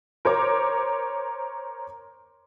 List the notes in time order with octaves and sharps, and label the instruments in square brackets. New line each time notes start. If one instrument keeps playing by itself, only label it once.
[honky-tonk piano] A#4 C5 C#5 D6